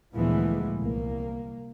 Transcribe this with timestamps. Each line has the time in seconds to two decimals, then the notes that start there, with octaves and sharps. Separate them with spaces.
0.15 D2 A#2 E3 F3 G#3 B3
0.79 C2 A#3